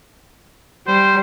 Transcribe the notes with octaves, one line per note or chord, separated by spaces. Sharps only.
G3 C5